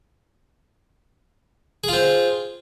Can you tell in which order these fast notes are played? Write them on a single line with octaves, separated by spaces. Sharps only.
G#4 F4 C4